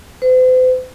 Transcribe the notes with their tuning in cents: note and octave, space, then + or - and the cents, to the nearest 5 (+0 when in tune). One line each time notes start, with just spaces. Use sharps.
C5 -45